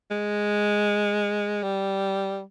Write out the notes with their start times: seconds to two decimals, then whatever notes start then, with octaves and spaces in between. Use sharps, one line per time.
0.11 G#3
1.63 G3